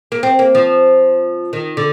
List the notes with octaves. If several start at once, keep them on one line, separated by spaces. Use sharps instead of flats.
A#3
C4
A#3
F3
D#3
D3